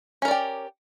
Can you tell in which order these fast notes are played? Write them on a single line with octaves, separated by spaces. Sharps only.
C#4 A#4 D5 G4